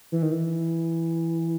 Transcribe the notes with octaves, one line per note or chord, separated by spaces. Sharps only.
E3
D#3
E3